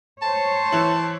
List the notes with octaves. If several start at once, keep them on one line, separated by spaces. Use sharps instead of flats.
C5 C#5 A5
E3 E4 E7